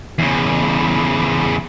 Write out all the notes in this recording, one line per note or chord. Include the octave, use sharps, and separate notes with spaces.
E2 C#3